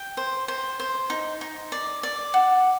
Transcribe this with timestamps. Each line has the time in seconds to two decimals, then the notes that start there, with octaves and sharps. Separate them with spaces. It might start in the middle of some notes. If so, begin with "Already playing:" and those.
Already playing: G5
0.17 C5
0.48 C5
0.80 C5
1.10 D#4
1.41 D#4
1.72 D5
2.03 D5
2.34 F#5